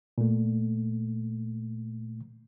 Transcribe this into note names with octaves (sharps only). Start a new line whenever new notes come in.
A#2 A3